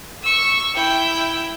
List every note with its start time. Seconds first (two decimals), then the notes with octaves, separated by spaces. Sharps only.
0.23 C#6 E6
0.74 E4 G5